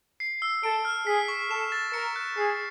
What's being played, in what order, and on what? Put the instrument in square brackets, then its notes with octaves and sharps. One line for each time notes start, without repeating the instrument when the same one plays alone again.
[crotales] C7
E6
[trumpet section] A4 [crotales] D7
[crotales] F6
[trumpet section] G#4 [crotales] B6
[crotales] C#6
[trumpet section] A4 [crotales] E7
[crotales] A6
[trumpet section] A#4 [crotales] C#7
[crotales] F#6
[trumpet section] G#4 [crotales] C7